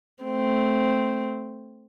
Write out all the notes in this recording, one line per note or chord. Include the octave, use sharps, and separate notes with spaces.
A3 C4